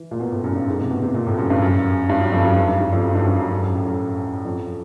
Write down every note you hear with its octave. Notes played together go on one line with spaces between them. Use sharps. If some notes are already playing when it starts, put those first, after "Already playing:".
Already playing: E3
A#2
B2
A2
F#2
G2
G#2
C3
B2
C3
A#2
A2
F#2
G2
F#2
G2
F#2
F2
F#2
G2
G2
G2
F2
F#2
G2
F#2
G2
F#2
F#2
F#2
A2
F#2
F2